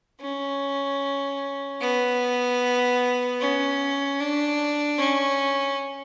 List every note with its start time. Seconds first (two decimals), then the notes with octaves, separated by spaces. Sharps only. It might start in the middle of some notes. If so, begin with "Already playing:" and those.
0.21 C#4
1.81 B3
3.40 C#4
4.20 D4
4.98 C#4